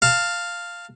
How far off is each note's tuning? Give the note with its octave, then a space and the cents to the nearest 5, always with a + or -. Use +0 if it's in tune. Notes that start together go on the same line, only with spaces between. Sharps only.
F5 +0 A5 +25